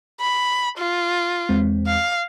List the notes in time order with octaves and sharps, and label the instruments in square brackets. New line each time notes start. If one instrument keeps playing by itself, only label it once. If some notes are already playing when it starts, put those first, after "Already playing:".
[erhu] B5
F4
[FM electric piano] E2 G#3 C4
[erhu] F5